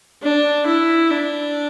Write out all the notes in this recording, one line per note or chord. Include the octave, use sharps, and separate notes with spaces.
D4
E4
D4